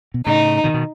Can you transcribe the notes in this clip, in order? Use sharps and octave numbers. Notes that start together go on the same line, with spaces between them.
B2
A2 C#3 D#4
B2 D#3
B2